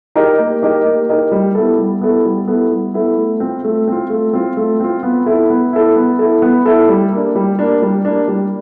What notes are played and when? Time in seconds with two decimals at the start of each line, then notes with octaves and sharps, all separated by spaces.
0.15 D#4 G4 A#4 D#5
0.39 A#3
0.62 D#4 G4 A#4 D#5
0.85 A#3
1.09 D#4 G4 A#4 D#5
1.32 G3
1.55 B3 E4 A4
1.78 G3
2.01 B3 E4 A4
2.25 G3
2.48 B3 E4 A4
2.71 G3
2.94 B3 E4 A4
3.17 A3
3.40 C4 F4
3.64 A3
3.88 C4 F4
4.10 A3
4.33 C4 F4
4.57 A3
4.80 C4 F4
5.03 B3
5.26 E4 A4
5.50 B3
5.73 E4 A4
5.96 B3
6.19 E4 A4
6.42 B3
6.66 E4 A4
6.89 G3
7.12 A#3 D4
7.35 G3
7.59 A#3 D4
7.82 G3
8.05 A#3 D4
8.28 G3